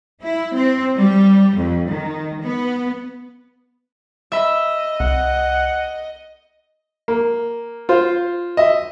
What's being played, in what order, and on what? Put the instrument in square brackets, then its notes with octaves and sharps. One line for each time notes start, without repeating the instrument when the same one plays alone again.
[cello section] E4
C4
G3
F2
D#3
B3
[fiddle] D#5 [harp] E5 B5
[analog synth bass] C2 [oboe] F#5
[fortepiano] A#3
F4 C5
D#5 E5